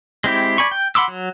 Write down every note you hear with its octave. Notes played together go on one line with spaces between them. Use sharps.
G#3 C4 E4 G4
D5 G#5 B5 C#6
G5
F#5 B5 C6 D6 E6
F#3